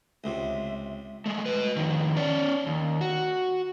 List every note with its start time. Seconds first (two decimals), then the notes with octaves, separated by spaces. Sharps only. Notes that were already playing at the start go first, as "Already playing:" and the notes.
0.24 C#2 C3 E5
1.26 G#3 A3
1.46 B4 D#5
1.76 F2 D#3
2.17 C#4 D5
2.67 D#2
3.01 F#4